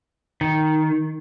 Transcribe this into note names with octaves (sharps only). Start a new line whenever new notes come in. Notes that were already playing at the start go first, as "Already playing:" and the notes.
D#3